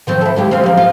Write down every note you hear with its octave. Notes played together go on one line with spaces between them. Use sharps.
D#3 F3 C4
E4 A4
D#2 G#3 G4
C4 C#4 F5
F3 A#3
F4